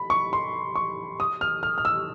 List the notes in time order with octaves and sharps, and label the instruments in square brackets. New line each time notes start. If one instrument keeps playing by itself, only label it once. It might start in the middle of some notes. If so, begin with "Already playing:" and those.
Already playing: [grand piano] B5
C#6
C6
C#6
D#6
F6
F6
F6
E6